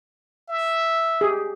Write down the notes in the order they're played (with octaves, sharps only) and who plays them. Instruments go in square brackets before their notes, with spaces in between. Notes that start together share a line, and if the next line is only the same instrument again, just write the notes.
[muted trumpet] E5
[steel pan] G4 G#4